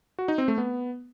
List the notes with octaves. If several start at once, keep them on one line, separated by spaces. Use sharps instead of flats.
F#4
D#4
C4
A3
B3